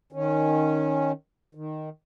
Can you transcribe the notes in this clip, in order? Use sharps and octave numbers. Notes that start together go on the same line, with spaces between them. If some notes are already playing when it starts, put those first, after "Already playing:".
D#3 C#4
D#3